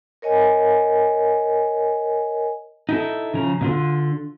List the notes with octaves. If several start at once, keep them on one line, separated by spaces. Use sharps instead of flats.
A#4 C#5 D#5 G#5
D#4 E4 A4
C#3 F3 A#5
A2 D3 F4